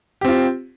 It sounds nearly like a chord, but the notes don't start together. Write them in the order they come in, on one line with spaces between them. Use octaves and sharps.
G4 C4 F4